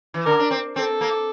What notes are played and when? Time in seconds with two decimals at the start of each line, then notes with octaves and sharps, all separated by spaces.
0.14 E3
0.26 D3 A#4
0.39 D4
0.51 C4
0.76 C4 A4
1.01 A#3